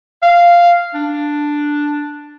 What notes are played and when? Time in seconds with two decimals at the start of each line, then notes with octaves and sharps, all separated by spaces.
0.23 F5
0.94 D4